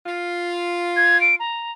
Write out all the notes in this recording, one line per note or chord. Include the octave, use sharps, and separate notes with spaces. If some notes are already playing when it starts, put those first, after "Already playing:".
F4
G#6
D7
A#5